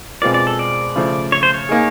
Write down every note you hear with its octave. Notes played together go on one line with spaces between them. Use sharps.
B2 G#3 C4 F4 A#4 D5
D5
A4
D5
C#3 F3 A3
C#5
C5
C#5
A#3 D#4 G#4